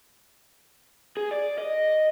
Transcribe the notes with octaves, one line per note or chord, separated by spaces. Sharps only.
G#4
D5
D#5